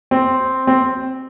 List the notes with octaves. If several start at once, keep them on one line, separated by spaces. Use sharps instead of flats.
C4
C4